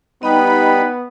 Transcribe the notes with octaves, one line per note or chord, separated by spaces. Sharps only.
G3 B3 D#4 B4 D#5 G5 B5